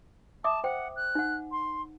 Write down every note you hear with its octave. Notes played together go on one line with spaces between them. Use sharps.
E5 A5 D6 D#6
C5 F#5 G5
F#6
D#4 F#5
C6